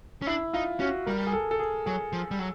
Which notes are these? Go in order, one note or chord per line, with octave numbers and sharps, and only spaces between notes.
C#4
D4 E4
D#4 F4
C#4 F#4
G3 A#4
G#4
A4
A4
G#4
F#3 G#4
F3
G3
F#3